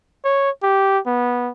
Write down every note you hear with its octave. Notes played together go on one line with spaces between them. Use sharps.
C#5
G4
B3